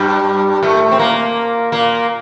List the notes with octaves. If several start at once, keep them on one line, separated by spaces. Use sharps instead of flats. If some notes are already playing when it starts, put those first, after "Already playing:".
Already playing: G2 G3
A2 A3
C4
A#2 A#3
A#2 A#3